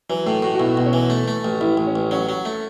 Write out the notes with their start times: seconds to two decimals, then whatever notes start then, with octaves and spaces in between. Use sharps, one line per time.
0.09 E3 F#3
0.26 A2 A3
0.42 A2 F#4
0.55 F#4
0.60 B1 E4
0.77 B1
0.86 C#4
0.93 E3
1.10 A3
1.28 A3
1.45 A1
1.61 A1 E4
1.77 A1
1.87 C#4
1.96 A1
2.11 F#3 C#4
2.29 F#3
2.45 A3